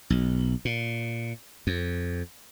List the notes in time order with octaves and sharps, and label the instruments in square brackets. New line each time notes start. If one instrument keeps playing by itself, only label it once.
[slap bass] B1
A#2
F2